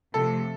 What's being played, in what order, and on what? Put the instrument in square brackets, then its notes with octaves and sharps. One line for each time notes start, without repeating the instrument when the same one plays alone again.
[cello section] C3 F3 A3 [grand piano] A4